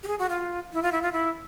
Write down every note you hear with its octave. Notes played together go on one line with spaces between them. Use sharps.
G4
G#4
F#4
F4
E4
F4
E4
F4
E4